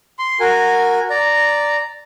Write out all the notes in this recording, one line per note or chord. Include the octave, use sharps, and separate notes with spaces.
C6
F#4 A#4 G#5
D5 A#5